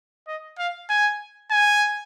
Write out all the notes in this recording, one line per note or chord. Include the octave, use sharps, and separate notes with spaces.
D#5
F5
G#5
G#5